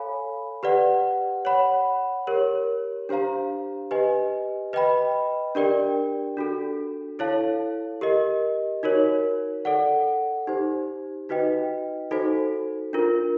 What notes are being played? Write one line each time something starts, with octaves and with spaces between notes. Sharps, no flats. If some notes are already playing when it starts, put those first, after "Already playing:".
Already playing: A4 C#5 F5 G#5 B5
G4 B4 D5 F#5
C#5 F#5 B5
G4 A#4 C#5
D4 G4 C5 F5 A#5
G4 B4 D#5 G#5
B4 D#5 G5 B5
D4 G4 A#4 D5 G5
D4 F#4 A4
E4 A4 C#5 F5 A5
G4 A#4 D#5
D#4 F#4 A#4 C#5
A4 D5 F#5
D#4 G4 C5
D#4 F#4 B4 D#5 G5
D#4 F#4 A4 C5
D4 F4 A#4